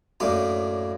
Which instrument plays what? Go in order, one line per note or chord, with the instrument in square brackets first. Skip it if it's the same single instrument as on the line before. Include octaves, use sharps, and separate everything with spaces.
[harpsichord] F#2 A2 A#3 D4 D#6